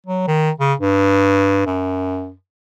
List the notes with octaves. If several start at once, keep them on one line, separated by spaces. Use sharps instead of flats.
F#3
D#3
C#3
G2
F#2